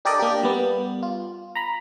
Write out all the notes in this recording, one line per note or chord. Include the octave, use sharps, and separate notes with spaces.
D4 G4 A4 A#4 D5 D#5
A#3 D4 G4
G3 B3
F4
A#5 B5